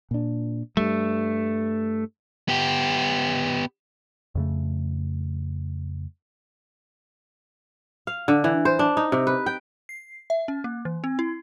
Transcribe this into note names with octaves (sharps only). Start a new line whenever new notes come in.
A#2 D4
G2 G3 A3
B3 G4
F2 C#3 A3
F5
D3
E3
C5
D4
D#4
C3
B4
G5
C7
E5
C#4
A#3
E3
C4
E4